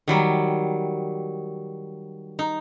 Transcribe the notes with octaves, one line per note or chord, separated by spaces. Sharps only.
D#3 F#3 G3
D#4